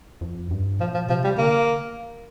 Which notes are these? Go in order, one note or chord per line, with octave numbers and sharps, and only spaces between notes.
F2
G2
A#2 F3
F3
C3 F3
G3
D3 A#3